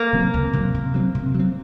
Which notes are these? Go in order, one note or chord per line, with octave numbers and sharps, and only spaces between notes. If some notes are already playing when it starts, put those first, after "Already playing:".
Already playing: A#3
C3 F#3 C4
C#2
C3 F#3 C4
C3
F#3 C4
C3
F#3 C4